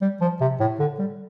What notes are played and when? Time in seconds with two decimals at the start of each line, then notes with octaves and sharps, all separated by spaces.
0.02 G3
0.21 F3
0.41 C3
0.60 A2
0.80 D3
0.99 G3